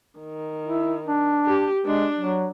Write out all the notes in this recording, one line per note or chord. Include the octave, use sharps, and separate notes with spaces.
D#3
E4
D4
G4
G#3 D4
F#3